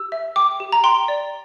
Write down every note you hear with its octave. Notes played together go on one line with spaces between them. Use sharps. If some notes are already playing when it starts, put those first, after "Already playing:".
Already playing: G4 E6
E5
G5 D6
G4
A#5
G5 C6
D5